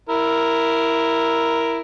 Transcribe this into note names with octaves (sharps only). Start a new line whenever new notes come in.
E4 A#4